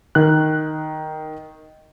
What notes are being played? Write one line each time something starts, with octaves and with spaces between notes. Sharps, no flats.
D#3 F#6